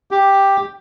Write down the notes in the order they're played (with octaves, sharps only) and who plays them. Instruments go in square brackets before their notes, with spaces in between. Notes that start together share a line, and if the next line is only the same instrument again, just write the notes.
[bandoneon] G4